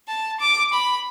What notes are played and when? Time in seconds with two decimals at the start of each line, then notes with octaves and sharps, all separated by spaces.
0.08 A5
0.40 D6
0.73 B5